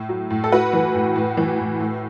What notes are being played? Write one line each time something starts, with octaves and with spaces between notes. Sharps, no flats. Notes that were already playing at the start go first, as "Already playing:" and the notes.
Already playing: A2
F#3
A2
A4
A2 F#4 B4
E3
A2
A2
E3
A2
A2